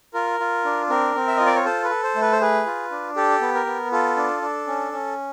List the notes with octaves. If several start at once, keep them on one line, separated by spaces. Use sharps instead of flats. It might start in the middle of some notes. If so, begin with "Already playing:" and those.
F4 A#4
F4
D4
C4 A#4
C4
E5
F4 D#5
D5
C#5
A4 C5
B4
A4
C5
A3
B4
C5
G#4 B4
F4
D4
G4 A4
B3
A#4
B3
F4 A4
D4
D4
C#4
C#4